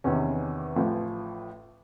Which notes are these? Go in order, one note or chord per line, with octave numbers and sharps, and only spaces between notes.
E2 C3 D#3 B3 C#4
A1 A2 F3